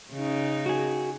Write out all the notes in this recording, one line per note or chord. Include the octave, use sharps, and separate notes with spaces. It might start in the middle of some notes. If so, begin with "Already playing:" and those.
C#3 D#4
F#4 G#4